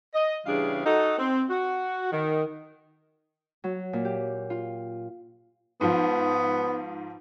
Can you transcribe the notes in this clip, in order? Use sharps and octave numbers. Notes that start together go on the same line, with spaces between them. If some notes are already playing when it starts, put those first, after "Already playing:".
D#5
C#3 E3 G3 D4 G#4 F5
D#4 F#4 A4
C4
F#4
D#3
F#3
A#2
G4
F4
G#2 F3 B3